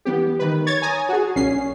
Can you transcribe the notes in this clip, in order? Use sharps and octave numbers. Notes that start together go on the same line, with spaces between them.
E2 B3 G4
D#3 B4
C#5 G#6 A6
G#5 A#5 D#6
F#4 G#4
A#1 C#4 C7